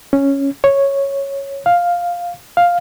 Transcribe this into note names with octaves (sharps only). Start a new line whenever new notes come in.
C#4
C#5
F5
F5